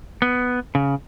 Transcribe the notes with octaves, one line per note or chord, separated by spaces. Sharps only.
B3
C#3